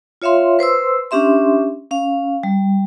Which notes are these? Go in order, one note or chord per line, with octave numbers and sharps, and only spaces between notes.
F4 C#5 E5 F5 C6
B4 C5 C6 E6
C#4 D4 G4 E5 C6
C#4 F5
G3